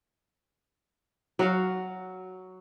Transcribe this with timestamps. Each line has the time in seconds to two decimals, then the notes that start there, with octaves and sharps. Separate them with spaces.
1.39 F#3 F#4 F5